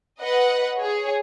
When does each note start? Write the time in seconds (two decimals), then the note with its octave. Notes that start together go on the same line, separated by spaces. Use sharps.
0.21 B4 D#5 F#5
0.77 G#4 C#5